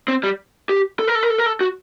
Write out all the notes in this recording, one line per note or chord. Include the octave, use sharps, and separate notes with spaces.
C4
G3
G4
A4
A#4
A4
A#4
A4
A#4
A4
F#4